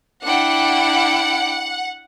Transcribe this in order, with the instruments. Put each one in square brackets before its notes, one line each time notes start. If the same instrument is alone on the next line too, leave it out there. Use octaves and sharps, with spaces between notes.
[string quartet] D4 E4 G5 [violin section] F#5